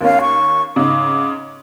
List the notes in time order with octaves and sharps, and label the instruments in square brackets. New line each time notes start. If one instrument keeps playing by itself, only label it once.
[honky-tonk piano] D#2 A#3 C#4 [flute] F5
[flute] C#6
[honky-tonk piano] G#2 C#3 [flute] D6